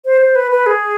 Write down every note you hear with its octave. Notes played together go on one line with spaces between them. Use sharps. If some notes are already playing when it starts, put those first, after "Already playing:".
C5
C5
B4
B4
G#4